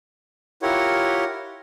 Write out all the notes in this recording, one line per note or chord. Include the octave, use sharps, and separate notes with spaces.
E4 F4 G4 A#4 C#5 F#5